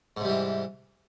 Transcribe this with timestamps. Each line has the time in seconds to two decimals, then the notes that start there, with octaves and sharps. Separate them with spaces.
0.17 G#2
0.21 C3
0.25 G3
0.29 E3